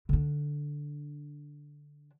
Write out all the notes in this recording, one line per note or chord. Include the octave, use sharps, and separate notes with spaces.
D3 D4